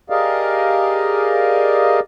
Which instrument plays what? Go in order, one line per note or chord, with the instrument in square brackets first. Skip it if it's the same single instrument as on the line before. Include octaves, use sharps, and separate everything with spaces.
[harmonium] G4 G#4 A#4 D5 D#5 F5